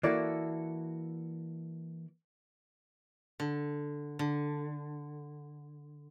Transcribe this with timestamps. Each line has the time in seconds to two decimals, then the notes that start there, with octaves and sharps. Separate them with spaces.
0.03 E3 A#3 E4 F#4 A4 D5
3.40 D3
4.19 D3